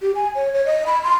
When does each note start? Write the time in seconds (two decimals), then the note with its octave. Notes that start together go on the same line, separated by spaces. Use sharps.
0.02 G4
0.15 G#5
0.35 C#5
0.53 C#5
0.66 D#5
0.87 B5
1.03 C6